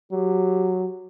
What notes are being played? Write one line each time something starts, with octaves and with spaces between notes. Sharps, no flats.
F#3 G4